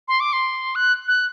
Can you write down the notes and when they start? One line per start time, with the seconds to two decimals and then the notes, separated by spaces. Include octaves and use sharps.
0.08 C6
0.20 D6
0.33 C6
0.75 F#6
1.08 F#6